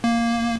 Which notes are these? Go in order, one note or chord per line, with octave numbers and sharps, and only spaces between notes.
A#3